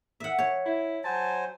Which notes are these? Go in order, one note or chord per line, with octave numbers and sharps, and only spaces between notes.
E5 F#5
C#5
E4
F#3 C5 G#5 A5